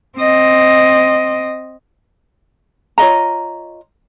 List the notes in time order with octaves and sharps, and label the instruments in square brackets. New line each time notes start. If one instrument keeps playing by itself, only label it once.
[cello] C4 D#5
[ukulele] F4 C#5 D#5 A#5